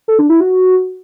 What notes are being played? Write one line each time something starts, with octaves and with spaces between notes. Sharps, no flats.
A4
D4
E4
F#4